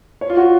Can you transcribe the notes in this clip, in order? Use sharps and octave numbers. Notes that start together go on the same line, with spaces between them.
C#5
F4
F#4